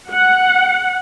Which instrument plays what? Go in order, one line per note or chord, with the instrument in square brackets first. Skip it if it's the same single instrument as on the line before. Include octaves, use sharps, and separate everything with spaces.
[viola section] F#5